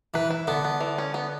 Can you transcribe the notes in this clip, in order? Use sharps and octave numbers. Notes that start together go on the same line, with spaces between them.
E3 B4
E4
D3 B3
B3
E3
C#4
B3